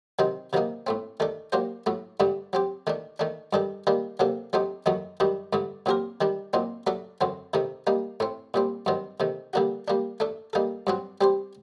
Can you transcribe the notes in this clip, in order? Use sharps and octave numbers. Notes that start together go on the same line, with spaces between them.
C3 D#3 F#3 C4 D#4
C3 D#3 F#3 A#3 D#4
A2 A3 C4
D#3 A3 D4 A4
F#3 A#3 D4 G4 C5
A2 F#3 A3
G2 D3 A3 D4 G4
F#3 C4 G4
D#3 A3 D4
D#3 A3 D4
G2 D#3 G3 D4 A4
D#3 G3 A#3 D4
C3 F#3 A#3 D4 A4
F#3 A3 C4 D#4 G4
F#2 D#3 F#3 A3 D#4
F#2 D#3 G3 D4
G2 D3 A3
A#2 F#3 C4 G4 A#4
D#3 G3 D4
A#2 F#3 C4 D#4
F#3 A3 D4 A4
F#2 D3 F#3 C4
C3 D#3 A3 D#4
G3 A#3 D#4
A2 A3 C4
A#2 G3 C4
G2 D#3 F#3 C4
C3 D#3 A3
D3 G3 A#3 D4 F#4
G3 A#3 D4
A3 D4 A4
G3 A#3 D#4 A4
G2 F#3 C4 F#4
G3 C4 G4 C5